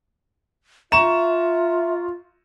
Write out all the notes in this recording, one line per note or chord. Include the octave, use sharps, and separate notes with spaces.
F4 E5 A#5 C#6 E7